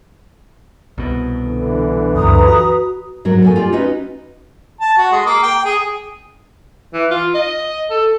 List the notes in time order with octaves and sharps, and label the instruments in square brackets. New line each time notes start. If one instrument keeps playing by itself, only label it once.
[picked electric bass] C2 B2
[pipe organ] D3 E3
[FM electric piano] C#2 F#2 [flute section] B4 A#5 D#6
[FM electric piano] F#4
[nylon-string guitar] G#2 F#3 A#4
B2 A3 G#5
F4 G4 D5
C#4 D#4 F#4 B4 D#5
[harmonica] A5
F#4
G#3
A#3
G5
G#4
[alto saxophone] E3
F4
D#5
A4